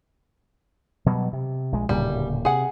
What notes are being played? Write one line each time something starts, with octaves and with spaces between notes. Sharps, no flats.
B2 F#3 G3
C3
A#1 G#3
D1 A#2 C#3 G3
C3 G#4 F#5